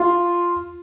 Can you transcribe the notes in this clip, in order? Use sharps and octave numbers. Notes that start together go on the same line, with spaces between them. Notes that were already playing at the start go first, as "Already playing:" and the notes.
Already playing: F4